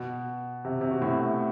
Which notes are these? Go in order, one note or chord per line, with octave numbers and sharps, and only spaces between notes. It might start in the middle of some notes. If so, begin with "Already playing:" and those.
Already playing: B2
C3
C3
B2
A2